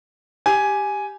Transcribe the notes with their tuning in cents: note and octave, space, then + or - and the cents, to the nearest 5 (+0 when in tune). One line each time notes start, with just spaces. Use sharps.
G4 +0 G#5 +5